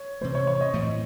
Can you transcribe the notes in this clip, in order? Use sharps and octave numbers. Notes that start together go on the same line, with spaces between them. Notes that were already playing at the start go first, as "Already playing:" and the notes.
Already playing: C#5
C3 E3 A3 C5
C#5
C#5
D#5
A2 E3 A3 C4